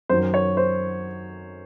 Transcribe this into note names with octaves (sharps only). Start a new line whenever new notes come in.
F#2 D#3 F#3 C5
C#5
C5